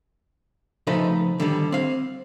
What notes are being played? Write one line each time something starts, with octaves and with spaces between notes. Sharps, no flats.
C#3 F3 A3 D#4 B4 C6
D3 D#3 G3
C4 F5